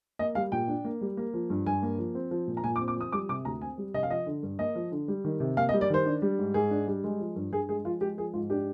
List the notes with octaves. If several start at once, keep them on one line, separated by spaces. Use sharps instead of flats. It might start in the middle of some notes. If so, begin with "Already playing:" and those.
A#3 D#5
G3 F5
A#2 G5
D4
A#3
G3
A#3
F3
G2
G2 G#5
A#3
F3
C4
F3
A#2
A#5
A#2 G#5
D6
C4
D6
F3 D#6
G3 D6
C3 D6
D2 A#5
C4 G#5
G3
C3 D#5
F5
F3 D#5
D3
G2
A#3 D#5
F3
D3
G3
D#3
C3
A#3 F5
D#5
G3
D5
D#3 C5
D4
G3
G#2
G#2 G#4
D4
G3
G#3
F3
G2
G2 G#4
G#3 G#4
F3 F4
G#3 G4
F3 G#4
G#2 F4
D4 G4